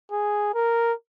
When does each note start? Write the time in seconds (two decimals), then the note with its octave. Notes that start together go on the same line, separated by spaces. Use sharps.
0.12 G#4
0.54 A#4